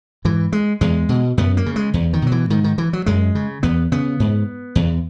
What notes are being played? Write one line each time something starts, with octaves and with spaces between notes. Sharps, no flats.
G#2 E3
G#3
E2 G#3
B2
F#2 B3
A#3
C#3
G#3
E2
D#3
B2 F#3
E3
G#2 D#3
D#3
E3
F#3
F#2 G#3
C#3
E2 B3
C#3 B3
G#2
E2